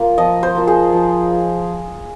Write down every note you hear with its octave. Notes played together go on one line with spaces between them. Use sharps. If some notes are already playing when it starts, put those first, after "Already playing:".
Already playing: A#3 F4
F3 D#5
C5
A#3 F4
G#4
F3